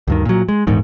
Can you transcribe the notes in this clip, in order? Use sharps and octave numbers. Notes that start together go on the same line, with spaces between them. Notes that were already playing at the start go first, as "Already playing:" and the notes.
D2 G2 D#3
A#2 F#3
G#3
D#1 E2 G#2 D#3